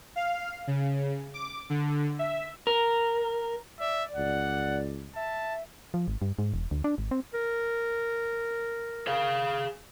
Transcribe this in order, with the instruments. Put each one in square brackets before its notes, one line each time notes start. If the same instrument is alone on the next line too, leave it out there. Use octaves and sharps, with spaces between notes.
[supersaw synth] F5
C#3
D6
D3
E5
[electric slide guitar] A#4
[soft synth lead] D5 [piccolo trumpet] E5
[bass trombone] C#2 [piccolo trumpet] F#5
[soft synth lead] E5 [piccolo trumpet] A5
[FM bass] F3
G#1
G2
G#2
E1
D2
D4
G#1
C4
[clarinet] A#4
[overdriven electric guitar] G#4 F5